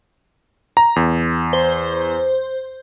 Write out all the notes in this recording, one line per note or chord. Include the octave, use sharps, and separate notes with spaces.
A#5
E2
C5